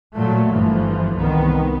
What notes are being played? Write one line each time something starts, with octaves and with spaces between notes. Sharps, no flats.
A#2 F#3 A3
G1 E3 F3
C2 D#3 B3